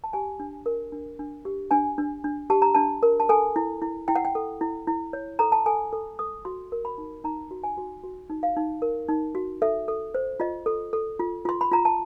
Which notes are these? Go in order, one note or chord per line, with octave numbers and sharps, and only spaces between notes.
A5
G4 G#5
D4
A#4
D4
D4
G4
D4 G#5
D4
D4
G4 A5
A#5
D4 A5
A#4
A5
A4 G#5
E4
E4
E4 G5
F#5
G5
A4
E4
E4
C#5
A4 A#5
A5
A4 G#5
A4
A4 D#6
F#4 C6
A#4
B5
D#4
D#4 A#5
F#4
G#5
F#4
F#4
D#4
F5
D#4
A#4
D#4
F#4
A4 E5
A4
C5
F4 D#5
A4
A4
F4
F4 C6
B5
F4 A#5
A5